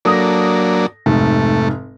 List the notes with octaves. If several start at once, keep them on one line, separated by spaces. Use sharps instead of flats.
F#3 A#3 D4 A4 D#6 A#6
F1 G#2 A3